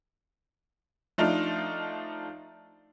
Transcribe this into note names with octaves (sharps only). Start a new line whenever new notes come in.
F3 A3 D4 D#4 F4